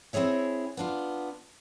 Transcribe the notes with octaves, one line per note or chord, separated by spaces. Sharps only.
C4 E4 G#4 C#5 E5
B3 D4 F4